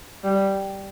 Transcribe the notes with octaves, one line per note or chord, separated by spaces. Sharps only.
G3